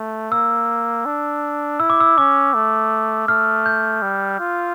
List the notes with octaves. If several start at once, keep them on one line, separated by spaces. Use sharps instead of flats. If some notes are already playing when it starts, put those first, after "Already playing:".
Already playing: A3
A#3 E6
D4
E4 E6
D6
E6
C#4 D6
A3
A3 F6
G6
G3
F4